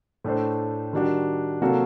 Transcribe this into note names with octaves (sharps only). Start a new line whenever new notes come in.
A2 A3 D4 A4 C5
D#3 G3 D4 F#4
C3 F#3 A#3 F#4 A4